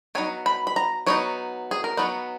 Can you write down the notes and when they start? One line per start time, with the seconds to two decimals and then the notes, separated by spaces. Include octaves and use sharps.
0.15 F#3 B3 D#4 G#5
0.46 B5
0.67 B5
0.76 A#5
1.06 F#3 B3 D#4 C#5
1.71 G#4
1.84 A#4
1.97 F#3 B3 D#4 B4